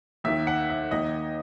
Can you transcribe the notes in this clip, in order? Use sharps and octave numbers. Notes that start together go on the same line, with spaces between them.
D#2 D#3 E5
F#5
E5
D#2 D#3 D#5